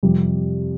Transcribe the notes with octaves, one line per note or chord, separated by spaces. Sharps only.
F2 C3 G3